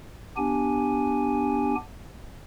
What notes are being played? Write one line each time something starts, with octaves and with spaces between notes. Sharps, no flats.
B3 D4 G4 G#5